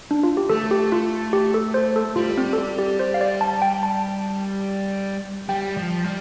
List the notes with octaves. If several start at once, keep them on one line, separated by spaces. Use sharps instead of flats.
D4
F4
G4
A3 A4
G4
F4
G4
A4
C5
A4
G3 F4
C4
A4
G4
G4
C5
F5
D5
A5
G5
A5
G3 G5
F3
G3